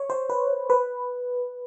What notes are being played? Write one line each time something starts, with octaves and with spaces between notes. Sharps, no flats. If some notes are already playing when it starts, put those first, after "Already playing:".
Already playing: C#5
C5
B4
B4